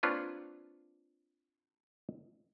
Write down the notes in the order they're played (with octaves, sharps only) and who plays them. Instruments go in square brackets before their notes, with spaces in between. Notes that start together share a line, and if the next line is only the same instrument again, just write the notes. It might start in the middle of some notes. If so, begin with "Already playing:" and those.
[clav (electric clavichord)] A#3 C4 D4 F4 B4 C#5